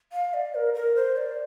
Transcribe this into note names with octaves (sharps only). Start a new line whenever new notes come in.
F5
D5
A#4
A#4
C5
D5